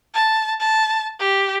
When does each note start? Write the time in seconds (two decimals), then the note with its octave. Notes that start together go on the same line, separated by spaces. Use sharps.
0.14 A5
0.60 A5
1.20 G4